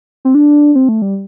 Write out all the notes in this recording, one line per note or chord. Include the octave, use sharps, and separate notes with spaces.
C4
D4
C4
A3
G3